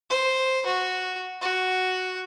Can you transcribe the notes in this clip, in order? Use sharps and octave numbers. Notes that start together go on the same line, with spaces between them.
C5
F#4
F#4